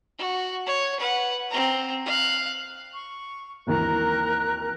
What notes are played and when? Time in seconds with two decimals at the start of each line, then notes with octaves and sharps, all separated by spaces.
0.18 F#4
0.66 C#5
1.00 B4 F#5
1.50 C4 A#5
2.05 F5 F#6
2.93 C#6
3.67 G#1 D#2 E3 A#4 A#5 F#6